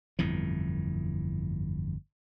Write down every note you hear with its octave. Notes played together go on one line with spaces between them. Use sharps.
G1 F2 A2 E3